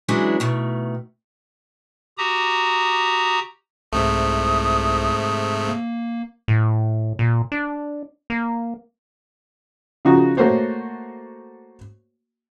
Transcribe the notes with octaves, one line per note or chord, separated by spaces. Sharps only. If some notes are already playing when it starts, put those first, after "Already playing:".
E3 F#3 G#3 C#4 D4 E4
B2 D#3 A3
F#4 G4 A#5 D#6
C2 G#2 C3 A3 D#6
A#3
A2
A#2
D4
A#3
C#3 F3 D#4 F#4
A3 A#3 F#4 C5 C#5